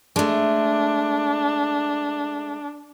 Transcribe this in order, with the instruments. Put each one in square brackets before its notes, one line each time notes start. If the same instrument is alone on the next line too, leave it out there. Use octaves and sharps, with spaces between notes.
[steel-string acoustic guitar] G#3 A3 [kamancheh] D4